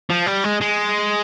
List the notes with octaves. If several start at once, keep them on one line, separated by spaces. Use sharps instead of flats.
F3
G3
G#3
G#3